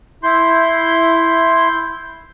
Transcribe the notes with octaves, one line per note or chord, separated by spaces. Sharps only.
E4 C6 G6